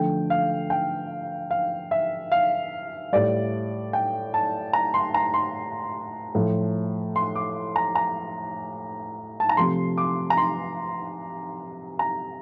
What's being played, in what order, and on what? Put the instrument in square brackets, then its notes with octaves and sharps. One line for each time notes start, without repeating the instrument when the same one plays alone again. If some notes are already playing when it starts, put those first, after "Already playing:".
Already playing: [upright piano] D3 F3 A3 G5
F5
G5
F5
E5
F5
A2 G3 D5
G5
A5
A#5
C6
A#5
C6
A2 F3 A3
C6
D6
A#5
A#5
A5
A#5
C3 F3 A3 C6
D6
A#5
C6
A#5